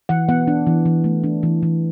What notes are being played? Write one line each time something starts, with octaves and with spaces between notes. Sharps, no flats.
E3 F#5
B3 F#5
D4
E3
E3
A3
D4
E3
E3